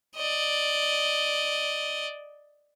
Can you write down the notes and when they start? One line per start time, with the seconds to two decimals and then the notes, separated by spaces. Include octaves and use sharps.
0.16 D5 D#5